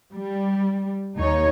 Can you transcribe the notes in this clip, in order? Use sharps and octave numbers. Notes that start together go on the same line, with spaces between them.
G3
D#2 D#4 C#5